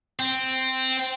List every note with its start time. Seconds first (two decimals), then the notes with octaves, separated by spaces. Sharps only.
0.19 C4